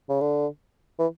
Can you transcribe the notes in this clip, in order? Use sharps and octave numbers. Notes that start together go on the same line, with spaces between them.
C#3
D3
E3